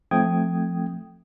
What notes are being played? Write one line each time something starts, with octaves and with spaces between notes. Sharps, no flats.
F3 A3 C4 G5 D#6 G#6